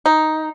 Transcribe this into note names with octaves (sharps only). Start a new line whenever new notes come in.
D#4